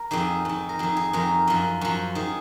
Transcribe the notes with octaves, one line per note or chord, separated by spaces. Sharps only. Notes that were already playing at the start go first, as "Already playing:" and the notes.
Already playing: A#4
F2 D#3 G#4
F2 D#3
A#4
F2 D#3 G#4
G#4
F2 D#3 A#4
F#2 F3
F#2 F3
D#3 G#4